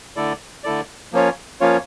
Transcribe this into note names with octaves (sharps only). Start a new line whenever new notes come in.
D3 A3 E4 A4 D5
D3 A3 E4 A4 D5
F3 A#3 C#4 F4 C#5
F3 A#3 C#4 F4 C#5